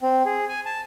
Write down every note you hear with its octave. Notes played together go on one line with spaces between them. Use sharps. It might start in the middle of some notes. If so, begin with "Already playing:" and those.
C4
G#4
G#5
A5